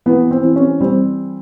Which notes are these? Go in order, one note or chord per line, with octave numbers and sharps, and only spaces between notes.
E3 B3
C4
E3
C#4
G3 C4